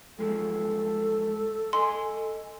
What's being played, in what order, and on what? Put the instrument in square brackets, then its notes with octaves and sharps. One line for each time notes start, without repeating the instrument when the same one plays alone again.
[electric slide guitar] G2 F3 G#3 [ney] A4
[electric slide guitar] D#5 G#5 A#5 [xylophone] C6